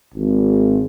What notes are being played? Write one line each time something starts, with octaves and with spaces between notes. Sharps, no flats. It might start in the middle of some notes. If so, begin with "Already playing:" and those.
G#1